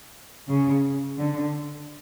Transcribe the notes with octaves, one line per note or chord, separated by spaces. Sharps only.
C#3
D3